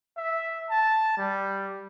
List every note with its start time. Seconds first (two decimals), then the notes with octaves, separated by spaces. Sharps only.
0.17 E5
0.70 A5
1.17 G3